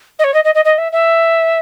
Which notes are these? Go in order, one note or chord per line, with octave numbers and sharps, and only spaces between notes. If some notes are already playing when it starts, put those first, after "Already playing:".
D#5
C#5
D#5
D#5
D#5
D#5
E5
E5